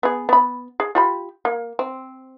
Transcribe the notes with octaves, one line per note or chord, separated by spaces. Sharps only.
B3 G#4
B3 B5
G#4
F4 G4 B5
A#3
C4